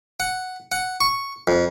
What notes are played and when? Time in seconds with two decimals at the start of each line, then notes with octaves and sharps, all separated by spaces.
0.20 F#5
0.72 F#5
1.01 C#6
1.48 F2